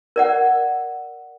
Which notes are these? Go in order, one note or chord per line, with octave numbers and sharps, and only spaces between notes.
A#4 D5 F#5